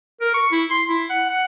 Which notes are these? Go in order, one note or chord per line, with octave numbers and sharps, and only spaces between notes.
A#4
C#6
E4
C6
E4
F#5
F#5